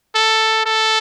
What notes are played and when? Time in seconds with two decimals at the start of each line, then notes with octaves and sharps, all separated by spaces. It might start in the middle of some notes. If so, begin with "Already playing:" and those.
0.15 A4
0.66 A4